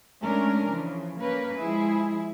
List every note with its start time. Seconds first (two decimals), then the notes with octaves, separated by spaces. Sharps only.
0.23 G#3 A3 C#4 D4 A#4
0.69 C#3 E3 F3
1.20 A#3 C#4 A#4 B4
1.56 F3 G#3 E4 G#4